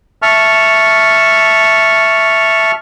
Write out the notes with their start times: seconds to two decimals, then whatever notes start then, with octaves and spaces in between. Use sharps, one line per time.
0.22 E5 A5 C#6 F6